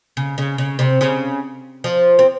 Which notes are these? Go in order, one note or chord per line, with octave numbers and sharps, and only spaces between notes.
C#3
C#3
C#3
C3
C#3
F3
C4